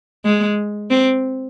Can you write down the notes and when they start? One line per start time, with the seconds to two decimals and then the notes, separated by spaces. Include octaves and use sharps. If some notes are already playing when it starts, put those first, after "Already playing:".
0.25 G#3
0.91 C4